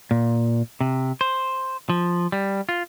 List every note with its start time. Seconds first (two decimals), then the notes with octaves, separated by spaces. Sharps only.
0.11 A#2
0.81 C3
1.21 C5
1.89 F3
2.32 G3
2.69 F4